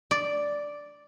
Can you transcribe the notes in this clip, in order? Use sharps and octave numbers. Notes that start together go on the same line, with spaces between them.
D5